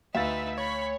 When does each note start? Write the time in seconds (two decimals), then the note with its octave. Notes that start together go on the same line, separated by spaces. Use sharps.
0.15 D2 D#4 B4 E5 F5 A6
0.58 C#5 B5